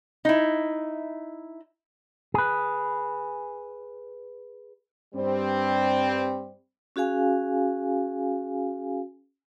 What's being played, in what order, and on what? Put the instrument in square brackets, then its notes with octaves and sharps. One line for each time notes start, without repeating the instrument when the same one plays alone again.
[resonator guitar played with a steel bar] D#4 E4
[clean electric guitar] G#4 B4
[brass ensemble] G2 G3 C4
[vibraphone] C#4 F#4 G#4 F5 G#5